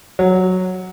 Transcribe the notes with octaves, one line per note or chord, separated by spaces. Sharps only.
F#3